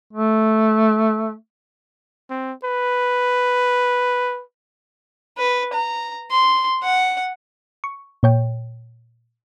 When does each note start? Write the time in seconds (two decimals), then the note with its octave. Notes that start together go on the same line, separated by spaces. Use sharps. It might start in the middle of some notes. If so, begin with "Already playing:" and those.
0.13 A3
2.30 C4
2.64 B4
5.37 B4
5.74 A#5
6.31 C6
6.83 F#5
7.84 C#6
8.23 A#2 C#5 G5